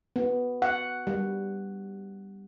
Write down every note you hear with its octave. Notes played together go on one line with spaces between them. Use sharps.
B3
F#5
G3